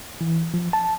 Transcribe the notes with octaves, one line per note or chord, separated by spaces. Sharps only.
E3
F3
A5